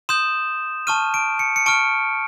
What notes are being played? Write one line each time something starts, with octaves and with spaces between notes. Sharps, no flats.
C6 D#6 G6 E7
A5 C#6 F6 D#7
D7
C#7
C#7
A5 C#6 F6 D7